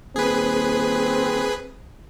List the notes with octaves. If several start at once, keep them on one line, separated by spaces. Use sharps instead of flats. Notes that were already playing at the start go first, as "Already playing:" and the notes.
D#1 C4 G#4 B4